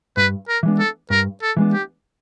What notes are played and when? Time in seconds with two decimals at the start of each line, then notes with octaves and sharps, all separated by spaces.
0.17 G2 B4
0.48 A#4
0.63 E3 G#3 B3 D4
0.79 A4
1.10 G2 A#4
1.42 A4
1.57 E3 G#3 B3 D4
1.73 G4